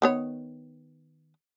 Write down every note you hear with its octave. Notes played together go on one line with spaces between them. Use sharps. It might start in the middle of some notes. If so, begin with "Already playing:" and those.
D#3 B3 C#5